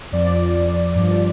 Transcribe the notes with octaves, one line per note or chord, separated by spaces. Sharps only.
F2 F3 D5
G2 F3